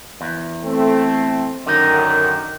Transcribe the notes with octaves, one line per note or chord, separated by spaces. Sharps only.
E2
A3 C4
F#2 D3 D#3 D#4